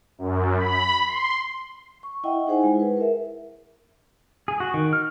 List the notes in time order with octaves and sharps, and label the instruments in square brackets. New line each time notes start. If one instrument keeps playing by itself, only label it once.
[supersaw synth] F#2
B5
C6
[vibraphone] C#6
E4 D#5 E5 F#5 G5
D#4 G#4 C5 F#5 G#5
G#3 E4 G#4
B4
A#4 E5
[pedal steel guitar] G#4
F#4
D#3
F6